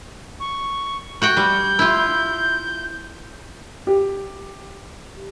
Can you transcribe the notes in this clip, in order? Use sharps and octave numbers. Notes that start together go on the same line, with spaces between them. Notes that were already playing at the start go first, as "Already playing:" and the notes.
C#6
F#4 F#5 G5 G6
G3
E4 F4
G4